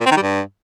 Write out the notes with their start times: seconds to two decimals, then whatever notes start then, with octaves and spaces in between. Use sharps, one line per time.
0.01 A#2
0.06 C4
0.11 D#3
0.17 G3
0.22 G2